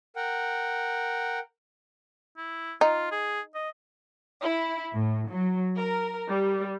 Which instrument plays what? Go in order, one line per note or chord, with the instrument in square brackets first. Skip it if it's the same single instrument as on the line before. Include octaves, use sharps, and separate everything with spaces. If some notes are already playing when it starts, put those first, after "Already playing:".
[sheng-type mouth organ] A#4 F#5 G5
[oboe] E4
[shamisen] D#4 [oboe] F4
[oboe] G#4
D#5
[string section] E4
A2
F#3
A#4
G3